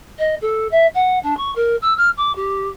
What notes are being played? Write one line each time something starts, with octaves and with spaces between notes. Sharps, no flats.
D#5
A4
E5
F#5
D4
C#6
A#4
E6
F6
D6
G4